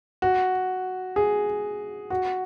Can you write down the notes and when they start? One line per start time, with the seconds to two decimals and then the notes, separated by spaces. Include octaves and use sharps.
0.22 F#4
1.16 G#4
2.10 F#4